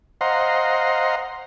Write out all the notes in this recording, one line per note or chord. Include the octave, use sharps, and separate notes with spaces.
C5 D#5 F5 F#5 A#5 C6